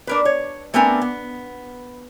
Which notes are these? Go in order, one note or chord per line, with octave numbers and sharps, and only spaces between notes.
D4 A#4 B4
C#5
A3 B3 C4 D4 A#4 G#5
B3